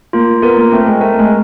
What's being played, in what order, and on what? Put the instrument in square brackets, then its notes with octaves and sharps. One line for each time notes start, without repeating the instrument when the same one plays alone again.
[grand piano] A#3 [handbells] F4
[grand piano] B3 [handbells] A#4
[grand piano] A#3
[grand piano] A3 [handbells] C4
[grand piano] G#3
[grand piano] A3 [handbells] A#4
[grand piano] G#3